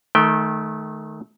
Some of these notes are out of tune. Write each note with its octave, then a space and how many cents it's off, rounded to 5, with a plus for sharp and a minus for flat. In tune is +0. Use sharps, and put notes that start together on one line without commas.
D#3 +0 A3 -25 G5 +0